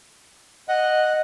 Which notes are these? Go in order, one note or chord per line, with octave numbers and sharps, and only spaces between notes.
D#5 F#5